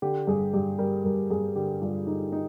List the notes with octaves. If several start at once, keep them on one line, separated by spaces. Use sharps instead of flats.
D3 G4
G2 G#4
G2 G4
G3 A#4
G2 A#4
G2 G#4
D3 G4
G2 F4
D3 D#4
D#4